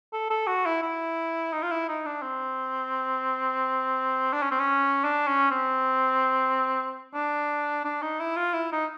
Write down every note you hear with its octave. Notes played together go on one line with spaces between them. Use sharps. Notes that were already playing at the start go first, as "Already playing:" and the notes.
A4
A4
F#4
E4
E4
D#4
F4
E4
D#4
D4
C4
D4
C#4
C4
C#4
D4
C#4
C4
D4
D4
D#4
E4
F4
E4
D#4